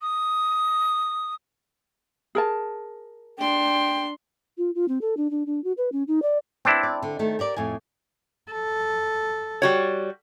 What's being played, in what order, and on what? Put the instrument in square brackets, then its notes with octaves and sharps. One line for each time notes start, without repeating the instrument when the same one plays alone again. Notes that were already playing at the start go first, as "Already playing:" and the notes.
[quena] D#6
[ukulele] G#4 A#4 A5
[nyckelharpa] D4 C6 [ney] G5
[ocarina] F4
F4
C4
A4
D4
D4
D4
F#4
B4
C#4
D#4
D5
[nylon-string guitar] B3 [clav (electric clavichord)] C4 D4 E4
[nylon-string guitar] D5
D3
D#3 A3 A4
G4 A#4 D5
F2 A2 G#5
[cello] A4
[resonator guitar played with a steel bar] G3 F#4 C#5